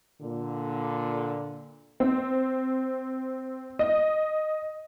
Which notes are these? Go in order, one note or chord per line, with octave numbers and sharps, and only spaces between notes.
A#2 D3
C4
D#5